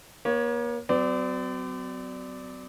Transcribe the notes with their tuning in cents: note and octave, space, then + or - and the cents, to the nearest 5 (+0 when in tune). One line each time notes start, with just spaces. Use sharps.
A#3 +40 C#5 +0
F#3 +15 C4 -45 D5 +0